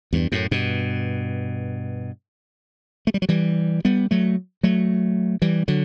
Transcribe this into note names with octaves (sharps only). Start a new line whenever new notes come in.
E2 G2
F#2 A2
G2 B2
A3
G3
F#3
E3 G3
G3 B3
F#3 A3
F#3 A3
E3 G3
D3 F#3